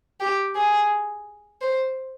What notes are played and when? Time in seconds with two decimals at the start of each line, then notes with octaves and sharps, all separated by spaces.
0.20 G4
0.56 G#4
1.61 C5